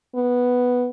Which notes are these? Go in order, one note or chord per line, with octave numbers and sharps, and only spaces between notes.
B3